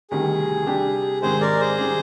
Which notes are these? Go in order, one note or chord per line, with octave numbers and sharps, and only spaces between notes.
D2 C3 D#3 G3 G#4
C3 G3 D4 G4
G#2 D#3 G#3 C4 G4 G#4 C5
A#4 D5
G#4 C5
C3 D#3 G3 C4